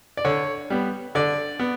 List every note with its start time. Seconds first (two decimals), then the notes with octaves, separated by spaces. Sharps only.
0.17 D5
0.25 D3 C#5
0.70 G3 B3
1.15 D3 D5
1.60 B3